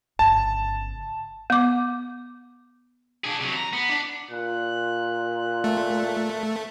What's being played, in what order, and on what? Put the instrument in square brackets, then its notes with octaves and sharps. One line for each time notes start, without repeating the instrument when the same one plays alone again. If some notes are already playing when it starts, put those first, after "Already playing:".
[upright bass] G1 C#3 [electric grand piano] A5
[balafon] B3 D6
[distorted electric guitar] D4 G#4
C3 F#3
A#5
B3
D4
[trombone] A#2 [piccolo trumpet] F#6
[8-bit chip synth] A3